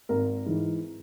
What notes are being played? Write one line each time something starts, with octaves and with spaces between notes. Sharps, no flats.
G#1 A#4
G#2 E3